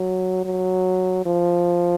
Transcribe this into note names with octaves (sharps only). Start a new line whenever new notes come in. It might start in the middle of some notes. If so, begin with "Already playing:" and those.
Already playing: F#3
F#3
F3